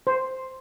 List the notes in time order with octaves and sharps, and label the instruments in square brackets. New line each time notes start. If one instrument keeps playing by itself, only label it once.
[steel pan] C5